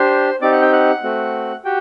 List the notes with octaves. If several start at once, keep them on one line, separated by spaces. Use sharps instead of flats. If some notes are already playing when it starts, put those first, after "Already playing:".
Already playing: D4 G4 C5 C6
C4 D#4 G4 D5 D6
F#5 F#6
G5 G6
F#5 F#6
A3 C4 F#4
F#4 G4 G5